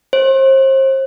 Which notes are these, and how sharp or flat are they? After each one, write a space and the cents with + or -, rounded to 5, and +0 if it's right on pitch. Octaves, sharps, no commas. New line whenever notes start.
C5 +35